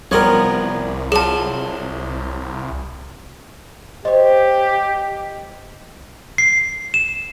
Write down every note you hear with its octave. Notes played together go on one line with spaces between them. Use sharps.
C2 F3 G3 B3 A#4 C#5
F#3 F4 G#4 A5
G4 C5 C#5 D#5
C7
E7